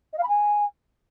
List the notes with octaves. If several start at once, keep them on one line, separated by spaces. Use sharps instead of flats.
D#5
F5
B5
G#5